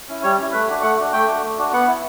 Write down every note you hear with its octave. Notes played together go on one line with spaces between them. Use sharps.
C#4 E4
G3 C#5
C#4 E4
A3 B4
D4 F#4
A3 F#5
D4 F#4
A3 G5
D4 F#4
A3
D4 F#4
B3 F#5
E4